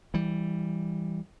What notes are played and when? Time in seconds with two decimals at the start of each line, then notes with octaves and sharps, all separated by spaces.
0.14 E3 G3